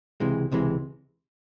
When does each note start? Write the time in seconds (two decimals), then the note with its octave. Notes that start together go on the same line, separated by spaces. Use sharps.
0.20 C#2 C3 E3 G#3
0.52 C#2 C3 E3 G#3